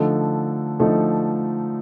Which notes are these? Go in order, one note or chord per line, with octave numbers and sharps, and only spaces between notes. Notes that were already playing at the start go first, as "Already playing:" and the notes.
Already playing: D3 F3 A3 D#4 A4
D3 F3 A3 D#4 A4